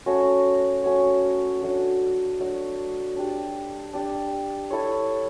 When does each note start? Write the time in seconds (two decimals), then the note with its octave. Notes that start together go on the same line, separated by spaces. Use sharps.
0.06 A3 C#4 F#4 C#5
0.84 A3 C#4 F#4 C#5
1.62 F#3 A3 D4 F#4
2.39 F#3 A3 D4 F#4
3.16 D4 G4 D5
3.93 D4 G4 D5
4.70 E4 A4 C#5